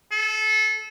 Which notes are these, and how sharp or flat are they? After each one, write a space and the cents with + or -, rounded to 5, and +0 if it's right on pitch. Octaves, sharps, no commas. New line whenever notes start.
A4 -25